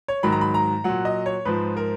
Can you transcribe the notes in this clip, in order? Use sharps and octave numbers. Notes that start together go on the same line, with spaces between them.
C#5
G#2 D#3 F#3 B5
A#5
B5
A#5
A#2 F#3 F#5
D#5
C#5
G#2 F3 B4
A#4